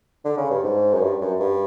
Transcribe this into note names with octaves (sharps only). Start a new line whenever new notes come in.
D3
C#3
G2
G#2
F#2
G2
F#2
G2